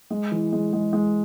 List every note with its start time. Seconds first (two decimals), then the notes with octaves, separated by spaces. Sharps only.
0.11 G#3
0.32 E3
0.53 G#3
0.73 G#3
0.93 G#3